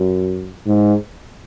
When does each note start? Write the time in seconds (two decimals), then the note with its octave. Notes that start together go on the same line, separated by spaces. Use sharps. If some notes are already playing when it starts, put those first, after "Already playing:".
Already playing: F#2
0.67 G#2